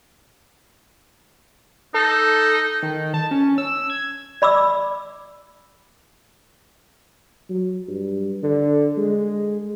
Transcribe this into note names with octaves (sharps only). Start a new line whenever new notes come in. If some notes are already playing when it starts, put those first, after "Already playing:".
D#4 A4
D#3
A5
C#4
E6
G#6
D5 B5 D6 E6
F#3
G2
D3
G#3